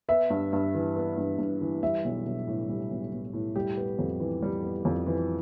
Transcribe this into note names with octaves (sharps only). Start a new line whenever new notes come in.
B3 E5
G2
G2
E3
B3
G2
G2
E3
G3 E5
B1
B1
A2
G3
B1
B1
A2
G3 G4
B3
F2
E3
G3
B3
F2
E3